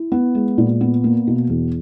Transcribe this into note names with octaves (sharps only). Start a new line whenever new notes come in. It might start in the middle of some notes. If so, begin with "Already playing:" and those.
Already playing: E4
B3
G#3
A#2
B3
A#3
B2
E2